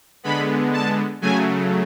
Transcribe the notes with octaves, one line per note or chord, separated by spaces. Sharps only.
D3 G#3 B3 B5
A5
C#3 F#3 A3 G#5